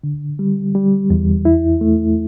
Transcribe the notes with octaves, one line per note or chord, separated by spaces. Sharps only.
D3
G3
G3
E2
E4
A3